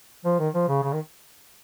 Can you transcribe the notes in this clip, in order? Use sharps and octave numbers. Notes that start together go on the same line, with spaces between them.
F3
D#3
F3
C#3
C#3
D#3